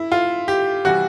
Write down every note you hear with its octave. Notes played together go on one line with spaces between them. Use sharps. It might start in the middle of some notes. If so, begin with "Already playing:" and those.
Already playing: E4
F4
G4
C3 E3 G3 F#4